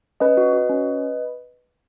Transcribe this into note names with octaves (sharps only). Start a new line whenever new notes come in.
C#4 B4 D#5
F#4
F#4
C#4